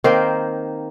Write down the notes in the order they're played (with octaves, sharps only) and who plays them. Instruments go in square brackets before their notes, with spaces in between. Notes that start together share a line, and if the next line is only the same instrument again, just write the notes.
[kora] D#3 A#3 C4 C5